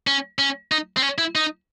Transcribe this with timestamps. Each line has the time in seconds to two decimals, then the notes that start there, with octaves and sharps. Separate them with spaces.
0.07 C#4
0.39 C#4
0.72 D#4
0.97 C4
1.02 C#4
1.18 E4
1.35 D#4